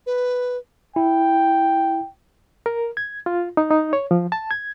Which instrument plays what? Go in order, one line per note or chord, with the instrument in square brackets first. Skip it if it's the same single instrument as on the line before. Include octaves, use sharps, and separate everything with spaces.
[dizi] B4
[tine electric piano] E4 [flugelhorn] G5
[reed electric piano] A#4
G#6
F4
D#4
D#4
C#5
F3
A5
G#6